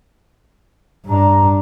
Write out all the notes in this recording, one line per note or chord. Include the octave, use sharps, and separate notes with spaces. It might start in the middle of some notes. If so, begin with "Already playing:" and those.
G2 D4 A#5